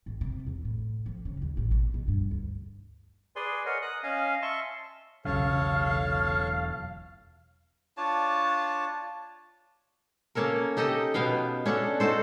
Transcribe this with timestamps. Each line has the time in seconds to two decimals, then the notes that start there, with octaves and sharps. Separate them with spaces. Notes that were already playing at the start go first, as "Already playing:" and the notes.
0.06 G#1
0.21 C3
0.47 E2
0.65 A2
1.06 F3
1.25 C#3
1.42 D#2
1.57 A1
1.71 B2
1.94 B2
2.08 G2
2.31 D2
3.36 G#4 B4 D5 G#5 C6
3.66 A#4 C#5 D#5 F#5 G#5
3.82 D#6 F#6
4.03 C#4 D#5 F5 G#5
4.42 E5 A5 C6 C#6
5.25 E1 B1 C#3 F#3 A4 C#5 F5 A5
7.97 D4 F4 C#5 A5
10.35 A#3 C#4 A4 A#4
10.77 D#4 G4 A4 D#5
11.14 B2 B3 F5 G5
11.66 C#4 D4 A4 F#5
12.00 D#4 F#4 A4 C5